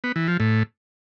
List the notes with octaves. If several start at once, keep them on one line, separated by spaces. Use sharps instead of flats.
B3
E3
F3
A2